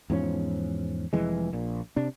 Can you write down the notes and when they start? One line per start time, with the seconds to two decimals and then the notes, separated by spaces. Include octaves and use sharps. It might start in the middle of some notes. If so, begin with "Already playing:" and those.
0.10 E2 G#2 F3 C#4
1.13 F1 F2 E3 G#3
1.53 A#1 A#2
1.96 C3 D4